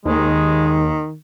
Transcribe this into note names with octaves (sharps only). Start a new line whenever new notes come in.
D#2 D#3 G#3